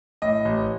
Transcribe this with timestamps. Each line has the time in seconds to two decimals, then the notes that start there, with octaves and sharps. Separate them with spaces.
0.22 A2 D#5
0.45 A1